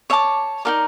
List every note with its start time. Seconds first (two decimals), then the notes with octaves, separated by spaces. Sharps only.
0.10 C#5 E5 A5 D6
0.65 D#4 F#4 A#4 D5